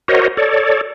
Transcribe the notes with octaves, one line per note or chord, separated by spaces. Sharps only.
F#4 A#4 C5 C#5 D#5
A4 C#5 D5